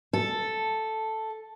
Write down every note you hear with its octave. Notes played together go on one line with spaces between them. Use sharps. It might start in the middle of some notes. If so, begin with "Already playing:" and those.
A4